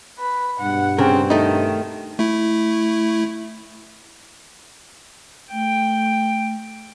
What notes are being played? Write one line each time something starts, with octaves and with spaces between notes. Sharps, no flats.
B4
G2 B2 F#5
C#3 C4 A#4
D#3 A3 D#4
A3 E4
A3 G5